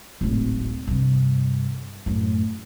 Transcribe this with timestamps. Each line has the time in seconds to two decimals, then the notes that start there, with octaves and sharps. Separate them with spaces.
0.21 D1 G#1
0.87 G2 C3
2.06 F#2 A2